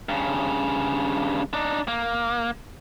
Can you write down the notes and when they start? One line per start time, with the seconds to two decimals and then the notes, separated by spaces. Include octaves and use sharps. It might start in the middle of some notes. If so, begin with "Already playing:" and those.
0.09 G2 C#3
1.54 D4 D#4
1.88 A#3